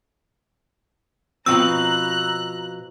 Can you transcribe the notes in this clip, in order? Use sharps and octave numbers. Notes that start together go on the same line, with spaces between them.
B2 F3 C4 A#5 E6 F#6